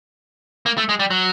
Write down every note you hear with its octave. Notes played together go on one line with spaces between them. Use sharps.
A#3
A3
G#3
G3
F#3